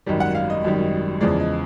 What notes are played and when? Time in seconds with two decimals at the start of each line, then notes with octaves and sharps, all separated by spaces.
0.06 G#1 F#2 D#3 G3
0.20 F#5
0.35 F5
0.50 D#5
0.64 G#1 F#2 D#3 G3
1.21 E2 C#3 F3 G#3 D5
1.40 D#5